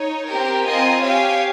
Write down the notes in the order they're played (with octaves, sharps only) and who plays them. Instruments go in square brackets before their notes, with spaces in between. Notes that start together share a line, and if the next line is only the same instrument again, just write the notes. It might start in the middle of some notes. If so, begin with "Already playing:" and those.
Already playing: [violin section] D#4 C#5
C4 G4 A#4
C4 F4 A#4 D#5 G#5
G4 C#5 F5 G#5